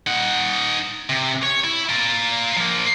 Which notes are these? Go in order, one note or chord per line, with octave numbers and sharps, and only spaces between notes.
D#4 F#5
C3
C#5
E4
F4 A#4
F3 A#3